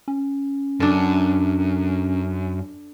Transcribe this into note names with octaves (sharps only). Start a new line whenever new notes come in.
C#4
F#2 D4 A4